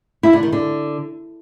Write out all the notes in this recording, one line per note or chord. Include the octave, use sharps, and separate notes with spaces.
E4
D3
D#3
D3